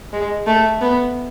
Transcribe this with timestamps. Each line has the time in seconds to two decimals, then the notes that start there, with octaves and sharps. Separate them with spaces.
0.13 G#3
0.47 A3
0.82 B3